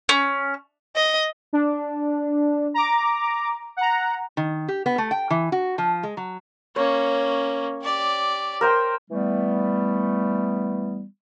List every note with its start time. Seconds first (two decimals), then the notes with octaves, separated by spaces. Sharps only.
0.09 C#4
0.96 D#5
1.53 D4
2.74 A#5 D6
3.77 F#5 A#5
4.37 D#3
4.68 G4
4.86 B3
4.98 A3
5.11 G5
5.30 E3
5.52 F#4
5.78 F3
6.03 G#3
6.17 F#3
6.76 A#3 C#4 C#5
7.82 G4 D5
8.61 A#4 C5 G5
9.10 E3 G3 A3 B3